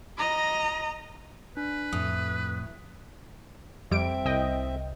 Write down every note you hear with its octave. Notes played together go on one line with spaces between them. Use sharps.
D#5 A#5
D4 B4
F2 A2 D#6
F2 G3 C4 E5 D7
C2 D#5 G5